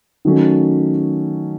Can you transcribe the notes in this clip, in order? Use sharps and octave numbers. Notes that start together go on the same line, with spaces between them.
D#3 F#3 A3 C#4